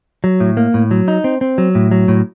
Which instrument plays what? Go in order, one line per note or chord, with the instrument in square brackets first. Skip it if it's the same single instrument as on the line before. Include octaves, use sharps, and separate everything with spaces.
[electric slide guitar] F#3
A2
A#3
A2
F#3
D#4
C4
C4
F#3
A2
F#3
A2